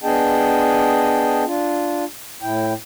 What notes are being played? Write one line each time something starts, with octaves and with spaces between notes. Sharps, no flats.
B3 D4 G#4 D#5 G5 A5
D4 F4
A2 E4 G5